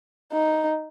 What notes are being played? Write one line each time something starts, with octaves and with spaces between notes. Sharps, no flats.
D#4